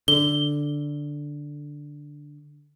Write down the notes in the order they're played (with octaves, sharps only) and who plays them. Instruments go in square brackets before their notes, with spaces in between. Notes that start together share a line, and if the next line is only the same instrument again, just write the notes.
[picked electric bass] D3 [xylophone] G7